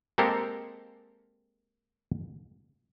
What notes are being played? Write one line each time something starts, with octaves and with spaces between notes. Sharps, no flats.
G#3 A#3 C4 G4 A4 A#4